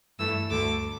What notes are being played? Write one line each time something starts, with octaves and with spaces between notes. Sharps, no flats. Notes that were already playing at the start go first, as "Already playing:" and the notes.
G2 E3 A3 E6
D2 D3 A3 D6